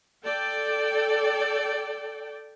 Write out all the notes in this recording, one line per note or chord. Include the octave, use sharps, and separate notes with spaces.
A4 D5 G5